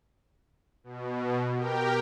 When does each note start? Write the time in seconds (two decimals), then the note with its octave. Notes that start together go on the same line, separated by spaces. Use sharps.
0.84 B2
1.56 G4 A#4 G5